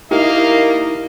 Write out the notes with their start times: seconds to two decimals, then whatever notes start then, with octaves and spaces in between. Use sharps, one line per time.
0.11 A#3 D#4 E4 G4 A#4 D#5 F5